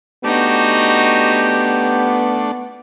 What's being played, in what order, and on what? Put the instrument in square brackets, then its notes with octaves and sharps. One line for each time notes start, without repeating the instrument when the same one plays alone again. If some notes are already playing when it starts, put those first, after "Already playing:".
[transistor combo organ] A3 D4 [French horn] B3 [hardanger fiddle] D#4 F#4 [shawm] G4